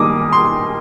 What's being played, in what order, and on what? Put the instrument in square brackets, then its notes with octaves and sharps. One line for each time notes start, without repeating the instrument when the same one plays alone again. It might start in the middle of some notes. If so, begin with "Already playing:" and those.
Already playing: [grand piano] D#3 G3 A#3 D#4 [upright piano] D6 D#6
[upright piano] C6